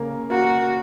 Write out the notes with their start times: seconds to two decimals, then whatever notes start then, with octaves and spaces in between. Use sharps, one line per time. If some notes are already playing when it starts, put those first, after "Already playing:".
Already playing: C#3 A#3 C#4 A#4
0.30 A#3 F#4 A#4